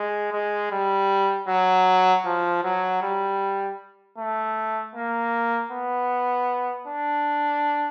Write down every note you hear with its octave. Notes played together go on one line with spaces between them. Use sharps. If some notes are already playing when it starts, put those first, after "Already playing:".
Already playing: G#3
G#3
G3
F#3
F3
F#3
G3
A3
A#3
B3
D4